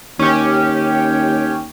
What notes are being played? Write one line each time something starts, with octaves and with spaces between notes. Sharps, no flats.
D#2 C#4 G4